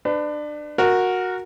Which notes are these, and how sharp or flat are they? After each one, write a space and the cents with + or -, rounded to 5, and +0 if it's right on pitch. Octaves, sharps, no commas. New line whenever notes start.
D4 +25 B4 +35
F#4 -10 A#4 +0